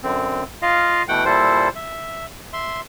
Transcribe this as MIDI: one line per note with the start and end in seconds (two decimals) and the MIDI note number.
0.03 0.43 42
0.03 0.43 50
0.03 0.43 60
0.62 1.03 65
0.62 1.03 75
0.62 1.03 77
1.08 1.24 47
1.08 1.24 52
1.08 1.24 57
1.08 1.24 78
1.08 1.24 79
1.25 1.69 46
1.25 1.69 55
1.25 1.69 64
1.25 1.69 69
1.25 1.69 72
1.75 2.26 76
2.53 2.80 76
2.53 2.80 84